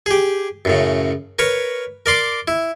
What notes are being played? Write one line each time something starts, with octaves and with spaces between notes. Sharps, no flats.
G4 G#4
F#2 A2 C#3
A#4 B4 C#5 B5
A#4 D5 C6 D6
E4